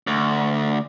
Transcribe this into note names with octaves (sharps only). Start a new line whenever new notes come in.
D2